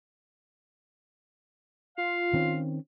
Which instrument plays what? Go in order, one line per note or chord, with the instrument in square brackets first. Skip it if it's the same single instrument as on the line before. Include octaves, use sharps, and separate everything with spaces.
[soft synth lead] F4 [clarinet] F5
[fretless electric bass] D#3 C4 C#4